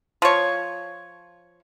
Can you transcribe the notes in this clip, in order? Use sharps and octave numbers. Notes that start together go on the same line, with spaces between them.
F3 C#5